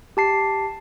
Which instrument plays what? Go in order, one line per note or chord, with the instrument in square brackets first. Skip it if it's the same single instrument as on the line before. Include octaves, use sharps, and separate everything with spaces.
[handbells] G4 A5 C7